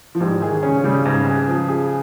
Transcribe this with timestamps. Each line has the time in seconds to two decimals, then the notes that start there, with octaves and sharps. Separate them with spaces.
0.15 F3
0.20 G#2 G3
0.42 D#3 G#4
0.63 C#3 C#4
0.84 C#3 G3
1.05 G#2
1.27 G#4
1.48 F3
1.69 G#4